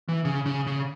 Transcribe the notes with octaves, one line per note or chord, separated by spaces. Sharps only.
E3
C#3
C#3
C#3